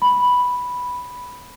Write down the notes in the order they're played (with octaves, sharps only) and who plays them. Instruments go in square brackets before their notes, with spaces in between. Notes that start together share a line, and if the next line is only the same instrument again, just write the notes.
[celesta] B5